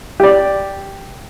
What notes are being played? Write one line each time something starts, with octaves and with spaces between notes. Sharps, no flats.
G4 D5